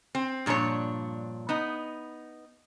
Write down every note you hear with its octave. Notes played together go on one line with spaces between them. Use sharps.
C4
G2 A#2 F3 D4 C#5
B3 D#4